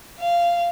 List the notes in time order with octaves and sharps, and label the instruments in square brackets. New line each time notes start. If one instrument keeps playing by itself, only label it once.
[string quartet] F5